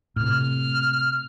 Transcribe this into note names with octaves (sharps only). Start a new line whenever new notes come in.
A2 C3 F6